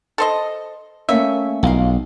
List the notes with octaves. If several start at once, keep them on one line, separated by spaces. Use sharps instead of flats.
A4 C5 D#5
A3 A#3 C#4 E5
B1 F4 A#4 F5